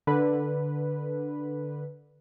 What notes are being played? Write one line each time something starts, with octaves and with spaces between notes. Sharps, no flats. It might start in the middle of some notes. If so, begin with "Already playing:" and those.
D3 B4